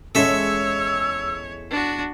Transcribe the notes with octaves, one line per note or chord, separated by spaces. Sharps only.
E2 G#3 C#4 A4 C#5 E5 E6
D4 F#4